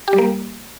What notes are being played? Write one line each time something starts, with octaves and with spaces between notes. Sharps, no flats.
G4
G3
A#3